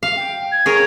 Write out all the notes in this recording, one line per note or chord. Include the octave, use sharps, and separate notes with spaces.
F5
G5
G#6
G#4 A#4 C#5